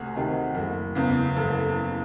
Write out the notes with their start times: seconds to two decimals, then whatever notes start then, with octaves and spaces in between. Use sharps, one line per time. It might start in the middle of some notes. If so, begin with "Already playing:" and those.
Already playing: D2 C3 F#4 G#4
0.15 C3 D#3
0.55 F#1
0.95 E2 C#3
1.36 F#1 A4